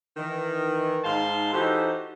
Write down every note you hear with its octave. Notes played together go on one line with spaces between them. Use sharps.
D#3 E3
G#2 D#4 F5 A5 C6
E3 D#4 F#4 G4 A4 C5